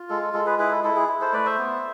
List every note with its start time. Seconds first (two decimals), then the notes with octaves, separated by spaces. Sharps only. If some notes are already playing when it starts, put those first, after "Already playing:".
Already playing: F4
0.10 G#3 A4
0.22 A4
0.34 G#3 A4
0.46 G#4 B4
0.58 E4 G#4 B4
0.71 A4
0.84 E4 A4
0.96 G#4
1.09 E4
1.20 A4 C5
1.33 A3 B4 D5
1.46 C5 E5
1.58 B3